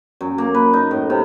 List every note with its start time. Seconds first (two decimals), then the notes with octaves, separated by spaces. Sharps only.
0.21 F#2
0.38 A#3
0.54 B4
0.73 D#4
0.91 A2
1.10 C3